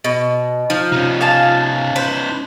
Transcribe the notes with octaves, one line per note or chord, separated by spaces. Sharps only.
B2
F3 D#4
C3 C#4 D#4
F5 G#5 A5
B4 C5